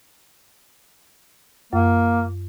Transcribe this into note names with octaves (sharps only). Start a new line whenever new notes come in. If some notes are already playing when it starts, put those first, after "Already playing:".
F#2 A#3